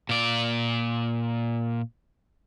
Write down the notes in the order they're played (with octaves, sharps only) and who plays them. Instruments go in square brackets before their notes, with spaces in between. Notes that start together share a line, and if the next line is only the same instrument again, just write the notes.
[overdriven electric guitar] A#2 D5